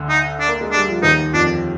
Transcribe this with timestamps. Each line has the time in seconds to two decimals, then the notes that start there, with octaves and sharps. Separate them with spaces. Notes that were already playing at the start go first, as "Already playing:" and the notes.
Already playing: D2 D3
0.09 D#4
0.40 D4
0.48 A#3
0.61 G#3
0.72 G3 D4
0.89 F3
1.03 D#2 D#3 D#4
1.33 F2 F3 D4